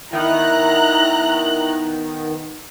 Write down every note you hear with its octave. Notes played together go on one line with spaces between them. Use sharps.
D#3 B3 E4 A#5 F#6